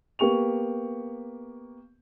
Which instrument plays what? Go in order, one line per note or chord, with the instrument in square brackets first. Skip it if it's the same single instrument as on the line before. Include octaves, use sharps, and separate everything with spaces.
[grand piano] A#3 B3 G4 C#6 F7